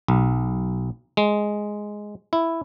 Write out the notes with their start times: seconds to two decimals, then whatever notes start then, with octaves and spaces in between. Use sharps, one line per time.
0.08 B1
1.17 G#3
2.33 E4